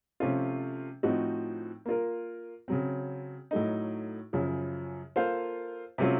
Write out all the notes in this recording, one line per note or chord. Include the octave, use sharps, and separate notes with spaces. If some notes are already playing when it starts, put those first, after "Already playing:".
C3 F3 A3 C#4 F4
A2 F3 C4 D#4 F#4
A#3 F4 A#4
C#3 F#3 C4
A2 F#3 A3 D#4
F#2 C#3 F3
A#3 F4 A4 C5 F5
C3 F#3 A3 C#4 F4